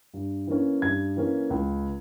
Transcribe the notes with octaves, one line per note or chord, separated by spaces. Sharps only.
G2
E3 A#3 C#4
G2 G#6
E3 A#3 C#4
C#2